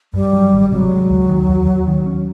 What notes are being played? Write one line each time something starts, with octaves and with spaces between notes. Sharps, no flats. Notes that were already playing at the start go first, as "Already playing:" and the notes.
G2 G3
F#3
G#1
C3 F#3
G#3
D2
D#3
D#2
D#2
D#3
C#4